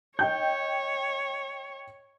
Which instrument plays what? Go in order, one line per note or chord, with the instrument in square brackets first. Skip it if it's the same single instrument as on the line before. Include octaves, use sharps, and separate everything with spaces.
[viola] C#5 [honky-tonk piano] D#5 G5 G6